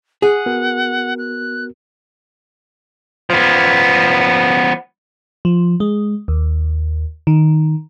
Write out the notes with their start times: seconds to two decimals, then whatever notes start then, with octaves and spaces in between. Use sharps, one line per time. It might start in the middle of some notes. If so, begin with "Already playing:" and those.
0.22 G#4 F#5
0.46 B3 F#4 A#4
1.18 F#6
3.30 F3 B3
5.45 F3
5.80 G#3
6.28 D#2
7.27 D#3